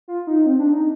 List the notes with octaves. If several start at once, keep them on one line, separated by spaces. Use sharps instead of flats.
F4
D#4
C4
D4
D#4